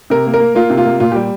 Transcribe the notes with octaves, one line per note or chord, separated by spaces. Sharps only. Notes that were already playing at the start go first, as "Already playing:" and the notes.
C3 A#4
A#3
A#4
A#3
A#3 F4
C3
F4
A#3
A#2 F4
G3 G4